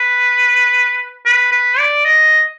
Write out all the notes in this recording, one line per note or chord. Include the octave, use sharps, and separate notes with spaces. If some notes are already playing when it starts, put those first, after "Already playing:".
Already playing: B4
B4
B4
D5
D#5